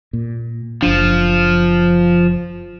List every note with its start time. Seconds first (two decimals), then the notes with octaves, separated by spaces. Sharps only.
0.13 A#2
0.82 F#1 F3 D4